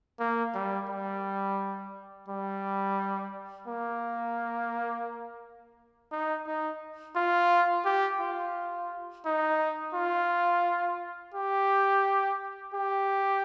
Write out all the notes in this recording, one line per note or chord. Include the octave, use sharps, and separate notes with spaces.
A#3
G3
G3
G3
A#3
D#4
D#4
F4
G4
F4
D#4
F4
G4
G4